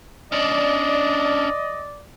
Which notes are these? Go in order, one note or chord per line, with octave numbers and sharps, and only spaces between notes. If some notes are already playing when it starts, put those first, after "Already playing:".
C#4 D4 D5 D#5